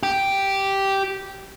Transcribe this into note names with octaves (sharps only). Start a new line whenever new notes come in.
G4